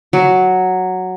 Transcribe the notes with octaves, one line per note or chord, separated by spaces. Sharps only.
F#3